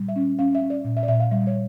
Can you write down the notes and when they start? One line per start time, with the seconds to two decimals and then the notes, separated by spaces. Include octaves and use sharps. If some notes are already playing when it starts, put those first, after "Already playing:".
Already playing: A#2 G3
0.08 E5
0.16 C#4
0.39 C#4 F5
0.55 E5
0.62 C#4
0.70 D5
0.84 A#2
0.97 E5
1.03 D5
1.08 A#2 E5
1.20 F5
1.31 G3 E5
1.47 C#5